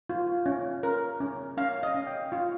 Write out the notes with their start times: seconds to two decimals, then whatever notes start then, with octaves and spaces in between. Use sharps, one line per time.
0.10 F4
0.46 C#4
0.83 A#4
1.20 C#4
1.57 C#4 F5
1.83 D#5
1.94 C#4
2.07 G5
2.32 F4 F5